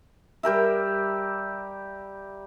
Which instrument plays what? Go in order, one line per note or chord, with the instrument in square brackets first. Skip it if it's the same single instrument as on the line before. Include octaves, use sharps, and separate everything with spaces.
[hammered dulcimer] G3 G4 A#4 E5